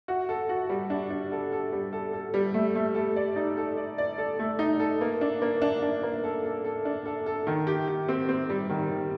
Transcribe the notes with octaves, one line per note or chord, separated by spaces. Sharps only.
F#4
A4
F#4
G3
D4
D4
A4
A4
G3
A4
A4
G3
A3
A3
A4
D5
D#4
A4
D5
D5
A4
A3
D#4
A4
A#3
D4
A#3
D4
D4
A#3
A4
A4
A4
D4
A4
A4
D#3
G4
G4
C4
C4
G3
D#3
D#3